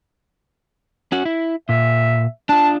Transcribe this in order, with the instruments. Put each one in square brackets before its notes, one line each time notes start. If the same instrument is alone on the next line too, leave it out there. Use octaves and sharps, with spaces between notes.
[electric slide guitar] C#4 F#4
E4
[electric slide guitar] A#2 [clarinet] E5
[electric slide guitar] D4 F4 [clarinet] A5